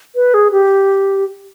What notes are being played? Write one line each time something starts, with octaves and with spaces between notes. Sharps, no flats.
B4
G#4
G4